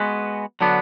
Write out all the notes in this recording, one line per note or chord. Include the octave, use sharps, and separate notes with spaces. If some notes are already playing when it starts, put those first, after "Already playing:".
Already playing: G#3 B3 F#4 B4
D3 F#3 B3 D4